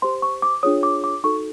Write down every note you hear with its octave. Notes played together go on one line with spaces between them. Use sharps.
G4 C5 C6
C#6
D6
D4 F4 G#4 C#5 D#6
D6
D6
D#4 F#4 A4 C#6